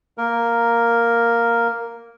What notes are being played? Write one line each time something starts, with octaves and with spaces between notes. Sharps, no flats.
A#3 A#4